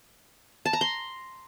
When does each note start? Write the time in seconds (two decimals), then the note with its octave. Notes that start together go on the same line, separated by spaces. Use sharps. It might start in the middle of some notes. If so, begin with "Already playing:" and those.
0.65 A5
0.73 A#5
0.81 C6